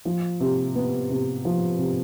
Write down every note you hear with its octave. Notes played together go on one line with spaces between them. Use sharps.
F3
C3
B3
C3
F3
C3